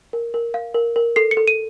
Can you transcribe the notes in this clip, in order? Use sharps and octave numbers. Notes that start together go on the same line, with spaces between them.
A#4
A#4
F5
A#4
A#4
A4 C7
C#7
A4
D#7